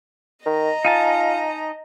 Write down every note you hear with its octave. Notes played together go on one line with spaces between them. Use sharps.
D#3 D#5 A#5
D#4 F4 G#5 A5